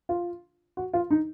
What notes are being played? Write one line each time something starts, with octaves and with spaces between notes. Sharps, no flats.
F4
F#4
F4
D#4